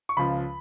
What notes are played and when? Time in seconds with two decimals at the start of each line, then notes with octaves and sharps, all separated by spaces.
0.09 C#6
0.17 C#2 C#3 F3 B5